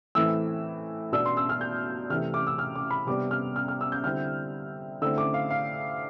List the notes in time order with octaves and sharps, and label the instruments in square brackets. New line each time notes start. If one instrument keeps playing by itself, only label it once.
[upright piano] A2 E3 A3 C4 E4 E6
B2 B3 D4 E6
C6
E6
F6
G6
C3 E3 A3 F6
D6
E6
F6
D6
B5
C3 G3 B3 D4 D6
F6
F6
F6
E6
G6
D3 G3 C4 E4 F6
D3 A3 C4 E4 E6
D6
F5
F5